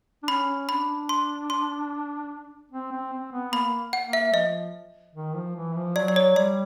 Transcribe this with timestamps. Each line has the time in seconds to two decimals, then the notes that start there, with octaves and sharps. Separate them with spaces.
0.23 D4
0.28 C#4 B5
0.69 D4 B5
1.09 C6
1.50 C6
2.72 C4
2.92 C4
3.13 C4
3.32 B3
3.53 A#3 B5
3.93 F#5
4.06 A#3
4.13 E5
4.33 F3 D#5
5.15 D#3
5.35 F3
5.56 E3
5.76 F3
5.96 F#3 D5
6.08 D5
6.16 C#5
6.36 G3 D5